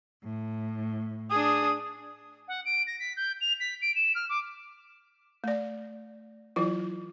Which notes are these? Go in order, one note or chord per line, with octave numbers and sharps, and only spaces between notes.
A2
D4 G#4 D#6
F#5
D7
A#6
B6
G6
F7
B6
D7
E7
F6
D6
A3 D5
E3 F#3 E4 F4